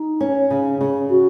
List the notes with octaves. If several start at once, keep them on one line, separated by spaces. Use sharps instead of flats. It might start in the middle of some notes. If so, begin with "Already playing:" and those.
Already playing: D#4
C#4
C#3
C#3
F#4